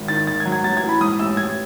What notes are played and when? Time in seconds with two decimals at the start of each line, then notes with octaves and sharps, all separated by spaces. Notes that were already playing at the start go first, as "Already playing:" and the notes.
Already playing: G#1
0.08 D#3 A6
0.27 G#2 A6
0.40 G#6
0.45 F#3
0.52 G#6
0.64 A1 A6
0.77 G#6
0.83 E3
0.89 B5
1.01 G#2 D#6
1.19 A1 E6
1.37 A1 G#6